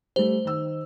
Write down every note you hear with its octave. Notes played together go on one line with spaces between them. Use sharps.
G3 A3 C5
D#3 E6